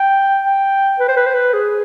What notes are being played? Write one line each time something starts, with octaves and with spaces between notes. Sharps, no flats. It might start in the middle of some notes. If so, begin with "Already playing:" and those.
Already playing: G5
G5
B4
C5
B4
C5
B4
G#4